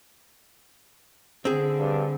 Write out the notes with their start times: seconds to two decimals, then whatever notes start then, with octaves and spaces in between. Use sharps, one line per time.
1.45 D3 C4 G#4
1.79 G2